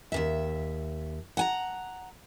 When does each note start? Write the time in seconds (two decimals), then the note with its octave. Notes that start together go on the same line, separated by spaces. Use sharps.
0.12 D#2 A#2 E5
1.37 F#5 G#5 A#5